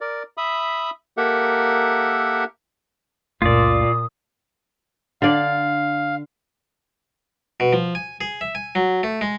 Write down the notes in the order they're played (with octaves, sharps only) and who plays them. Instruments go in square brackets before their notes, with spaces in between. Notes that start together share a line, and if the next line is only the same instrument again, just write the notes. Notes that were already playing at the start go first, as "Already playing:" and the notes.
[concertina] A#4 D5
E5 B5 D#6
A#3 G4 A4 A#4 E5 F#5
[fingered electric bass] C#2 F#2 A3 [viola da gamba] A#2 [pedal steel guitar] F4 D5 [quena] D#6
[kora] D3 D5 [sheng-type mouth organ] F5
[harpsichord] B2
F3
G#5
G#4
E5
G#5
F#3
A3
G#3